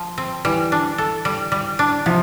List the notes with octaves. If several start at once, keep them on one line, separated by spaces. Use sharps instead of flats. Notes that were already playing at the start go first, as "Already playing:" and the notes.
Already playing: F3
C4
E3 G3
D4
A4
G3
G3
D4
C3 F3